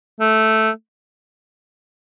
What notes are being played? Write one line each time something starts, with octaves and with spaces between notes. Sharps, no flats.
A3